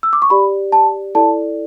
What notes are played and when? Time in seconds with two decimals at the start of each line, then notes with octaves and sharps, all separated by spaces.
0.03 E6
0.13 D6
0.22 C#6
0.30 G4 D5 B5
0.72 A5
1.15 E4 A4 D5 A5